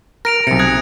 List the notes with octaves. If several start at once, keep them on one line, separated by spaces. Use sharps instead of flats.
A#4 A#6 D7 F7
B1 C3 C#7
D#6 F#6 G#6